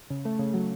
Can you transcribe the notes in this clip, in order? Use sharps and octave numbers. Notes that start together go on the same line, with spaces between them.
C#3
A3
C#3
F#3